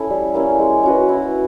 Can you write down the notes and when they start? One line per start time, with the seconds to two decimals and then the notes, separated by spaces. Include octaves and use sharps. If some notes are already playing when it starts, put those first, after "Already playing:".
Already playing: C#4 E4 A4
0.10 G3
0.34 A#3 C#4 E4
0.59 G#3
0.83 C#4 F#4 B4
1.09 E4